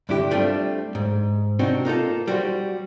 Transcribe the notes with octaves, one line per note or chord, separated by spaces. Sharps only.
G2 D3 E4 G4
G3 A3 C4 D4 F4
G#2
C3 C4 D4 D#4 F#4
A#3 D#4 F4 A4
G3 F#4 C5